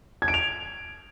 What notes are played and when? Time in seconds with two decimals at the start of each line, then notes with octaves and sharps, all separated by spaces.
0.22 G#6
0.28 D7
0.34 F7